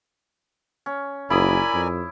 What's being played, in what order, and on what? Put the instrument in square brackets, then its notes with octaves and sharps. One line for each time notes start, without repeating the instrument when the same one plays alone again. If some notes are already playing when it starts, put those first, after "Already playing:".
[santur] C#4
[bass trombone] F#1 [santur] E4 D#6 [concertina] A#4 D5 G#5 [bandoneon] B5
[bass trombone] F2